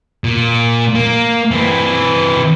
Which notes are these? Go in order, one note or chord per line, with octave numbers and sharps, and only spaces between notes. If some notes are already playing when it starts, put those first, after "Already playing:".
A#2
A#3
E3 C4